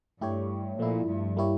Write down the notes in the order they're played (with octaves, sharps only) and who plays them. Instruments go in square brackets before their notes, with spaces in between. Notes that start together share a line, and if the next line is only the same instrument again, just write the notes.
[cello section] G2 [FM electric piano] A3 E4 G4 C#5
[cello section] A#2 [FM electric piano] F3 A3 E4
[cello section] G2
[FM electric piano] G3 A#3 E4 G4 C#5